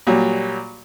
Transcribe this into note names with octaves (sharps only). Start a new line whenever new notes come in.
A#2 F#3 G3